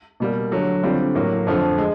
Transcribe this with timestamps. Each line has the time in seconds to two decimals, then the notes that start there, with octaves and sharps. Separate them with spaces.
0.20 B2 G3 A#3
0.51 D3 F#3 A3
0.83 D3 G3 C4 F4
1.15 A2 F#3 A#3
1.47 F2 D3 F3 A3
1.78 G#3